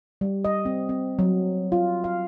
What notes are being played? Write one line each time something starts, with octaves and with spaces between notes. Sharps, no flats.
G3
D#5
C4
C4
F#3
F4
F5